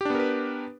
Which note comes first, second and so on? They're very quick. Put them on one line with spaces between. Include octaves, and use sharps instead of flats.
G4 D4 B3 A#4 B4